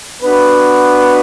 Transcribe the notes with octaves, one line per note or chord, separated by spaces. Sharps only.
B3 D4 F#4 B4